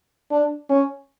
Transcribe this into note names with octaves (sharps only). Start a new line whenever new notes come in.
D4
C#4